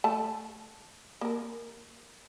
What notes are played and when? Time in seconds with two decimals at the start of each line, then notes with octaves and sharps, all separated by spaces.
0.04 A3 A5
1.21 A#3 A#4